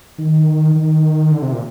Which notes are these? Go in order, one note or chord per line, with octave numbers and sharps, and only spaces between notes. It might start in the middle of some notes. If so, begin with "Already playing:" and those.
D#3
D#3
D3
C3
A#2